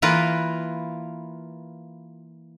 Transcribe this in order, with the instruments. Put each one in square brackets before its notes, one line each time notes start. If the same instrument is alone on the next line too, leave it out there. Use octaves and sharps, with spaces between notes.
[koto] E3 A#3 F4 A#4 B4